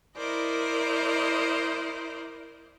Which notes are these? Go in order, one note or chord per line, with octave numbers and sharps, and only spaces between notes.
E4 A#4 C5 D5 D#5